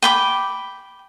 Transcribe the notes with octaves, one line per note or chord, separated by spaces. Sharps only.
G5 B5 D6